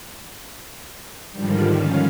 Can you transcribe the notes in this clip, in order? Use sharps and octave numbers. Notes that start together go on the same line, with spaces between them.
G#2 D3 D#3 F3 G3
C#4 F5